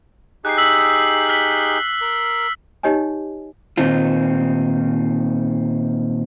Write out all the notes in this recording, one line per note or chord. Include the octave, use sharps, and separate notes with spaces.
D#4 G4 G#4 F#6 C7
E6 B6 F#7
F6 B6 F#7
A#4
D#4 G4 C#5 D#5 G#5
A#2 D#3 C4 D#4 F4